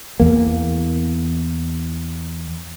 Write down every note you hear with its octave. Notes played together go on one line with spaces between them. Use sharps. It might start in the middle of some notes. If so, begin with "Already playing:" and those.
E2 A#3